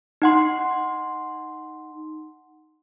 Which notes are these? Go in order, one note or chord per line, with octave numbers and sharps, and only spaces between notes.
D#4 F#5 C6